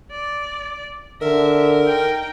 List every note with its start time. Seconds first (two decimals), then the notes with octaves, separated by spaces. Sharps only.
0.11 D5
1.22 D3 A#4 E5
1.87 D#4 G5